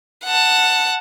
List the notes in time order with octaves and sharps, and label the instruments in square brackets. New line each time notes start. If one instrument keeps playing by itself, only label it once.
[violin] F#5 A5